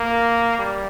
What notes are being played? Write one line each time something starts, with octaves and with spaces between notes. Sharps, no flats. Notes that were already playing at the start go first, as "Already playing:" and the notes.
Already playing: A#3
G3